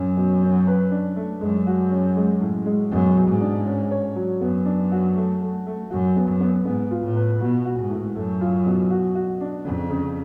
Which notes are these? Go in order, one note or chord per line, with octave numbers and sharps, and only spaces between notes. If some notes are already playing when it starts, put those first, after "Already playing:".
Already playing: F#2 C#4
B2
C#4
B4
D4
A3
F#2 G#3
F#4
C#4
G#3
A2
G#3
F#2 B2
B2
G#2
D4
C#4
C#5
F#3
F#2 B3
D4
F#4
A3
A3
A3
F#2 F#4
B3
F#2
B3
G#2 B3
F4
A2
B4
B2 F#4
F#4
G#2
A2
F#2 A3
F4
B2
F#4
F#4
D4
F2 C#3
C#3